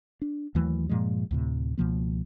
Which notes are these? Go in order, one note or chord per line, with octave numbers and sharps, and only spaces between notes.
D4
D#2 E3 F#3 A3
G2 A#2 F3 G#3
D2 A2 C3
C#2 B2 F3 A#3